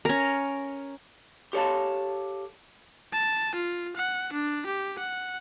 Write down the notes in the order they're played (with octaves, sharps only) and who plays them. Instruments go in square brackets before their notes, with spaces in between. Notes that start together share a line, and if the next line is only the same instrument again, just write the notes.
[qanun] C#4 A#4
[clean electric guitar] G4 A4 C#5 F5 A5
[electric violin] A5
F4
F#5
D4
G4
F#5